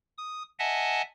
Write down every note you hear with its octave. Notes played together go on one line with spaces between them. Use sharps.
D#6
D#5 E5 F#5 G#5 A5